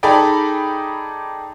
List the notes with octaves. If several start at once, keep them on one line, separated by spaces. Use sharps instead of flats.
D#4 G#4 A4 D5 G5 B5